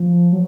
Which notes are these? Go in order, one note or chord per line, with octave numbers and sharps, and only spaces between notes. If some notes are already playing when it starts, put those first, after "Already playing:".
Already playing: F3
F#3